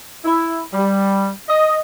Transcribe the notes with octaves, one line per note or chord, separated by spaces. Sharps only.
E4
G3
D#5